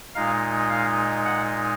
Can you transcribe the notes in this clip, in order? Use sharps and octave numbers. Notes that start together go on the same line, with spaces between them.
A#2 G#3 D#4 F5
F5
F#5